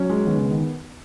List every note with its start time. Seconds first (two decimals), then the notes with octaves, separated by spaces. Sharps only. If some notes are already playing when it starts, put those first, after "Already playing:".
Already playing: F#3 C#4
0.10 G#3
0.27 D#3 B3
0.38 C#3
0.44 B3
0.51 D#3